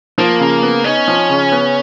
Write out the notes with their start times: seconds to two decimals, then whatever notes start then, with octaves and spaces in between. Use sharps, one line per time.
0.18 F3 A#3
0.40 C#3
0.63 B3
0.84 C#4 D#4
1.08 F3
1.29 C#3
1.52 B3